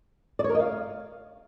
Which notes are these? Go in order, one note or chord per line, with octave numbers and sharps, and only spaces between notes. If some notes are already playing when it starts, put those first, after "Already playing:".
D5
C#5
A#4
D#5
F5